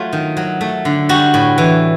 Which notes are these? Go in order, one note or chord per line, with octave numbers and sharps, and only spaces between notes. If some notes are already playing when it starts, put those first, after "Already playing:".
Already playing: F#3 A3 F4
D#3
F#3
A3
D3
G3 F#4
A2
E3